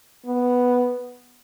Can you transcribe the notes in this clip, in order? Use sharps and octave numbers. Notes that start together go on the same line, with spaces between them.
B3